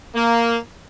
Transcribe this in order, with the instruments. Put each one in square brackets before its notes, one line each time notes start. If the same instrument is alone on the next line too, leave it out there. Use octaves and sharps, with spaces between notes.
[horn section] A#3